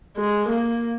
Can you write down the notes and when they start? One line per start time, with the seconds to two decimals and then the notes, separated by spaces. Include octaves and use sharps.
0.17 G#3
0.49 A#3